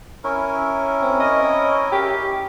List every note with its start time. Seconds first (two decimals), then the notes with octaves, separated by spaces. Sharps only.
0.24 C#4 E4 A#4
1.02 C4
1.20 D#5
1.92 G4